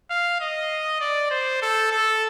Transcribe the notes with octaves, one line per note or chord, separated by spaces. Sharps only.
F5
D#5
D5
C5
A4
A4